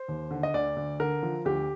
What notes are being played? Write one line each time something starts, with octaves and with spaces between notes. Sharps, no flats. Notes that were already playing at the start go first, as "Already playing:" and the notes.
Already playing: C5
D#2
D3
D#5
D2 D5
D2
D3 A#4
F3
D2 G4